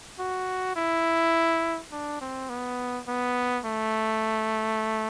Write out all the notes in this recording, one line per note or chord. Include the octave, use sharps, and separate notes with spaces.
F#4
E4
D4
C4
B3
B3
A3